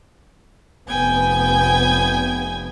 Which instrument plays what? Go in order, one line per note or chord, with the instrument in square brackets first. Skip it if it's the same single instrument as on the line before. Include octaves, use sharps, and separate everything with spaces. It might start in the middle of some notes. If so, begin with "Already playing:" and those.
[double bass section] F1 B3 [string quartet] G5 G#5 G#6